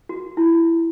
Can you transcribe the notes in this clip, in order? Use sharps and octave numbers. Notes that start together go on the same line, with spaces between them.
F#4
E4